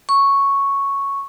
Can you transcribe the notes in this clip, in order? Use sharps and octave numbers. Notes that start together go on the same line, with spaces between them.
C#6